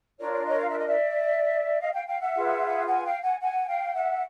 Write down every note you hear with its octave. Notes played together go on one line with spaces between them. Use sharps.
D4 F4 A#4 C#5 D5
D5
C#5 D#5
F5
E5
D#5
D5 E5
D#5 F5
F5 G5
F5 G5
E5 F#5
F4 G#4 B4
F#5 G#5
F5 G5
F#5 G#5
F#5 G#5
F5 G5
E5 F#5